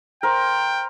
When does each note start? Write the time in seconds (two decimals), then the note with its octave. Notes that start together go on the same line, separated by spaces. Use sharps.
0.23 A#4 C5 G5